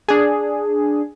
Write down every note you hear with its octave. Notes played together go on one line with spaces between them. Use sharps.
D4 G#4